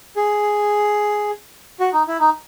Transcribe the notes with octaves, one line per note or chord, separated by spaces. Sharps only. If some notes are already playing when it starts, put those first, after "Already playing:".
G#4
F#4
D#4
E4
D#4